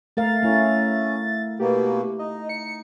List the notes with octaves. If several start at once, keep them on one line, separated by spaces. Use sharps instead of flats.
A3 A#4 F5 A6
A3 C#4 E4
B2 A#3 B3 G4
D#4 D#5
C#7